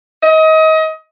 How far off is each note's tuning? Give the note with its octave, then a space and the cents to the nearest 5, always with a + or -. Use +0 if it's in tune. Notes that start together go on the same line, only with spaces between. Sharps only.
D#5 +30